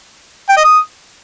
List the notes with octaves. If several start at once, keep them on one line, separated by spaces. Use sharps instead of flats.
G5
D#5
D#6